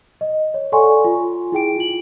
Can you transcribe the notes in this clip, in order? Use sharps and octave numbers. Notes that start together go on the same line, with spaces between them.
D#5
C#5
A4 D5 F#5 G#5 C6 C#6
F4
E4 G#4 G5 D7
F4 F#7